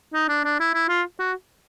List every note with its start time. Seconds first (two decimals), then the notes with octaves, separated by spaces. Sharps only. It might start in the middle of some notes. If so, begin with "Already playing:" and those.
0.14 D#4
0.29 D4
0.45 D4
0.60 E4
0.74 E4
0.89 F4
1.19 F#4